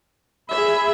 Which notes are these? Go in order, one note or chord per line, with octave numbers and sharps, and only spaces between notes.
G#4 E5 B5